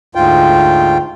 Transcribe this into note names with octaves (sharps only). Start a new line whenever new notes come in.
D2 G#2 F4 G5